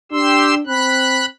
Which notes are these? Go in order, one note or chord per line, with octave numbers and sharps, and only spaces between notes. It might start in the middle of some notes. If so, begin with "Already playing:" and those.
D4 G4 C6 E6
C4 B5 F#6